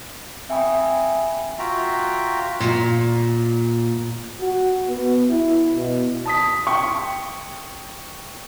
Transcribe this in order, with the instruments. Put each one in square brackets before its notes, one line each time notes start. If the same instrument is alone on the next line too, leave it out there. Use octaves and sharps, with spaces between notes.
[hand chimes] C4 E5 G5 G#5 B5 D#6
[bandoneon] F4 F#4 E5 G5 A#5
[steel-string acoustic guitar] A#2
[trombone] F#4
B3
E4
B2
[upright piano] A5 D#6 B6
G5 C#6